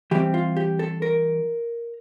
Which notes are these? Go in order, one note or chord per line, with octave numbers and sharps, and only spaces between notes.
E3 G3 C4 G4
F4
G4
A4
A#4